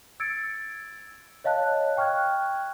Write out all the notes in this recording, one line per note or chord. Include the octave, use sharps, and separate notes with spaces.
E6 G#6 A6 C#7 D7
C#5 D#5 F5 A5 F#6
G5 C#6 F6 F#6 G#6